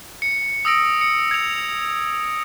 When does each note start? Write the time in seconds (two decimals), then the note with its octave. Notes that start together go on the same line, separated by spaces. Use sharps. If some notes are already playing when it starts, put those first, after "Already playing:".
0.22 C#7
0.65 D#6 E6 A#6 D7
1.01 C#7
1.31 G#6 F7